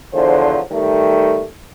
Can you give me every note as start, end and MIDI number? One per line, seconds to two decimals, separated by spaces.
0.13 0.60 40
0.13 0.60 50
0.13 0.60 53
0.13 0.60 54
0.13 0.60 72
0.72 1.45 51
0.72 1.45 55
0.72 1.45 57